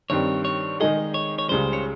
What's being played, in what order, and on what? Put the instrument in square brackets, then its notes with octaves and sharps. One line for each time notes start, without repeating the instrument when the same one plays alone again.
[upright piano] G2 D#3 G3 C4 [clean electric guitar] C#5
[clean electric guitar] C#5
[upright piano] D#3 G#3 D#4 G#4 [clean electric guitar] D#5
[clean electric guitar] C#5
C#5
[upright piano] C#2 C#3 G3 [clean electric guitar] C5
[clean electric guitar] C#5